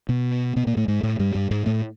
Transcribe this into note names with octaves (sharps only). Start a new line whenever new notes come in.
B2 B3
B2 B3
A#2 A#3
A2 A3
G#2 G#3
A2 A3
G2 G3
G2 G3
G#2 G#3
A2 A3